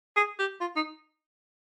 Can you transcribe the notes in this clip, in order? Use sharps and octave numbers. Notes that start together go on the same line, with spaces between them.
G#4
G4
F4
D#4